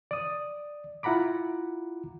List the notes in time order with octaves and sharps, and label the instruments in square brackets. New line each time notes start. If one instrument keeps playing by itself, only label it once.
[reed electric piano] D5 D#6
E4 F4 F#5 A#5 B5 D6